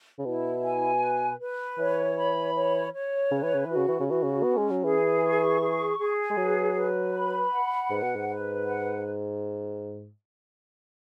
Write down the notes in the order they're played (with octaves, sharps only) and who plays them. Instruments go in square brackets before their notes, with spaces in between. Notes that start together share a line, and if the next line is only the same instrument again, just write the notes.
[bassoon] C#3
[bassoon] B2 [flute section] E4
[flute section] G#5
B4
B4
[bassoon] E3 [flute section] C#5
[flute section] B5
C#5
C#5
[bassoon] C#3 [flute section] B4
[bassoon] E3
C#3
[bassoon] E3 [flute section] F#4
[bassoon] C#3
E3
C#3
[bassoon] E3 [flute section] F#4
[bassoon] C#3
[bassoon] B3 [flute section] C#4
[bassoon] G#3
F#3
[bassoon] E3 [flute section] G#4
[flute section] C#6
G#4
G#4
[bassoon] G#3
[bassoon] F#3 [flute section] B4
[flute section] B4
B5
F#5
[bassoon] G#2 [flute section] B4
[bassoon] B2
G#2
[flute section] B4
F#5